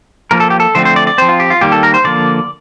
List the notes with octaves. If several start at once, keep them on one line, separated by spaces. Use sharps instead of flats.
F3 A#3 A#4
A4
G4
A4
D3 F3 A3 C4 C5
C5
D5
D5
F3 C4 C5
F4
G4
F4
D#3 G3 A#3 G4
A4
A#4
C5
D3 F3 A#3 D5